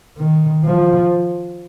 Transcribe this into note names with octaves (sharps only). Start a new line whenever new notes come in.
D#3
F3